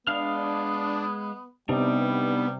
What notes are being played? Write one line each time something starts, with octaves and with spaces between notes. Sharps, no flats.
G#3 B3 D4 F5 F6
C3 G3 B3 D4 D#4